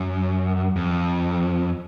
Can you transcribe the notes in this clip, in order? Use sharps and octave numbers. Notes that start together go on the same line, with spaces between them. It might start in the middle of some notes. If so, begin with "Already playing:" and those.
Already playing: F#2
F2